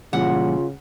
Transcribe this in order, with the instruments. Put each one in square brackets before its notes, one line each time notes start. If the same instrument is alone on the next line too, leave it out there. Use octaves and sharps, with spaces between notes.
[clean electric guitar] A#2 E3 G3 [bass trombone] C#3 [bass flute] F4 [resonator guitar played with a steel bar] F#5